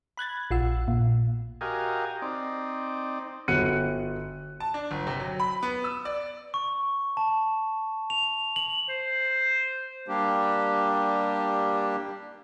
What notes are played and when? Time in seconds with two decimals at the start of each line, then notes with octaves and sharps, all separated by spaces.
0.17 B5 F#6 G#6 A6
0.51 A#1 F4 F#5 E6
0.88 A#2
1.61 F#4 G4 A#4 D#5 F5 G#5
2.22 C4 D#4 D5
3.48 G1 F#4 F#6 C#7 D#7
4.60 A5
4.74 D4
4.91 G1
5.07 C3
5.20 F#3
5.40 B5
5.63 B3
5.84 E6
6.05 D5
6.54 C#6
7.17 A5
8.10 F7
8.56 F#7
8.89 C5
10.08 G3 A#3 D4 G4